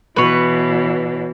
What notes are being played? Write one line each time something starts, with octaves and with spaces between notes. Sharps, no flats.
B2 E3 B4 C#5